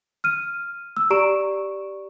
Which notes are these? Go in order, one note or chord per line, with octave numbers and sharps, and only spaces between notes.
F6 D#7
E6
G4 D5 A#5 C#6 D7 E7